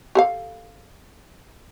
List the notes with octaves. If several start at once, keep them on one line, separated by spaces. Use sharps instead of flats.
G4 A4 F5